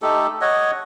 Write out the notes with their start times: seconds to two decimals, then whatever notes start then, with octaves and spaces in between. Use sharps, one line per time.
0.02 A3 D#4 G4 A4
0.41 C#5 D#5 F#5